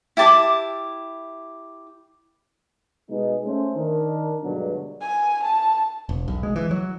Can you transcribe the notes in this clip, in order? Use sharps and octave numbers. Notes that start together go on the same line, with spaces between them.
E4 G4 A5 D6
B2 G#3 D#4
A3 C#4 C5
D#3 D4 A#4
G2 B2 D3 F#3 G#3 D4
G#5
A5
E1
B1
G#3
E3
F#3